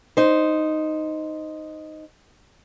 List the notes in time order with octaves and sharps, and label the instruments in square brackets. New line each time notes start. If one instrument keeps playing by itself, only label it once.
[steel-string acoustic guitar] D#4 C5